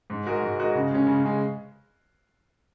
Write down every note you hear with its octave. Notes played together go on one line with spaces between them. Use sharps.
G#2
G#3 F#4 A#4 D#5
G#2
G#3 F#4 A#4 D#5
C#3
G#3 C#4
C#3
G#3 C#4